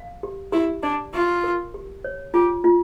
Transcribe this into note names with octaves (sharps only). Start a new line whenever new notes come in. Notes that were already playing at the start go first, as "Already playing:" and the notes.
Already playing: F5
G4
E4 G4
D4 D5
F4 C#6
A#4
G4
C#5
F4 G4
F4